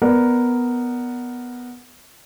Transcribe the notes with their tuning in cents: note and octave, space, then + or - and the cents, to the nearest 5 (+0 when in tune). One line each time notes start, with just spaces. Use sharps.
B3 +0 A#4 +0 D5 +0